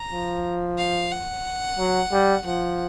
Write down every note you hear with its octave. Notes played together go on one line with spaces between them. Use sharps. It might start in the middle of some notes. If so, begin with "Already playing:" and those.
Already playing: A#5
F3
F5
F#5
F#3
G3
F3 F#5